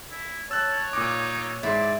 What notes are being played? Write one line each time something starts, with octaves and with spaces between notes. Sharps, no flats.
E4
C#5 A5 E6 F#6
A#2 D#4 D6
G#2 E4 D5 C6